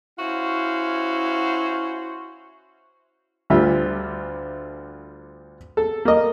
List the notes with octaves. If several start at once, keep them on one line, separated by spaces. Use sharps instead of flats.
C#4 E4 F#4 C5 F5
D2 D3 G3 F4 E5
A4
A#3 D#5